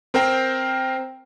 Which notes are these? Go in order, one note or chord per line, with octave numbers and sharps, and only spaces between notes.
C4 A#4 C5 G5